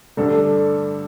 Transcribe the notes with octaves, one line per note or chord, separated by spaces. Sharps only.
G2 D3 A3 D4 A4